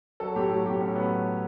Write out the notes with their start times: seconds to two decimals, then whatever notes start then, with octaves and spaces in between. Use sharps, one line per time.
0.20 F#3 A4
0.35 A2 G4
0.50 F#3 G4
0.66 A2 G4
0.80 A2 C#4
0.96 F#3 B3